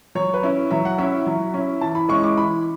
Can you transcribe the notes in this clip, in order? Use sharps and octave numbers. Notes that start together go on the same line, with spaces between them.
F#3 C#5
B4
C#4 E4
F#3 E5
F#5
C#4 E4 E5
F#3
C#4 E4
E3 A5
B5
G#3 C#4 E4 C#6
D6
E3 B5